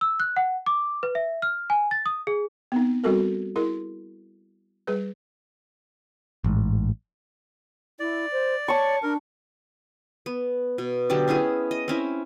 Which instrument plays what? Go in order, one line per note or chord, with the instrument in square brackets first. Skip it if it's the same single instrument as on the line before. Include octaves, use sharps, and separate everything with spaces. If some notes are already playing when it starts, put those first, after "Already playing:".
[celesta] E6
F#6
F#5
D6
B4
E5
F6
G#5
A6
D#6
G#4
[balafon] B3 C4 D#4
G3 C4 F#4 A4 A#4
E4 G#4 A#4
G3 G#4 B4
[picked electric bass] A1 G#2
[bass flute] E4 [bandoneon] D5
[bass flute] C5
[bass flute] C#5 [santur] A5 C#6
[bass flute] D4 [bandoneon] A#4
[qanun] B3
B2
D3 F#3 G4 D5
B3 C#4 E4 G#4
D#5
C4 C#4 E4